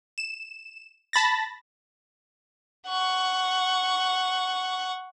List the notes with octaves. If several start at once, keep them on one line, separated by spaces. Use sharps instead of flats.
E7
A5 B5 A6 A#6
F#5 C#6